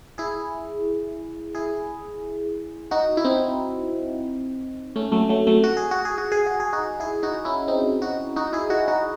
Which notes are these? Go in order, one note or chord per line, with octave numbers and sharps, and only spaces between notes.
E4 G#4
E4 G#4
D#4 F#4
E4
C4 D#4
A3 C#4
F#3 A3
F#3 A3
F#3 A3
F#4
G#4
F#4
G#4
F#4
G#4
F#4
G#4
D#4 F#4
E4 G#4
D#4 F#4
C#4 E4
C4 D#4
D#4 F#4
D#4 F#4
E4 G#4
D#4 F#4
D#4 F#4